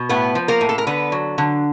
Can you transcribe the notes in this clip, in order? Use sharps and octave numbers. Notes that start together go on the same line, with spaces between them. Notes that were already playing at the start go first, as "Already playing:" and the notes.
Already playing: B2
A2 B3 B4
F3
A#3 A#4
A2
A4
A#4
D3 B3 B4
F#3
D3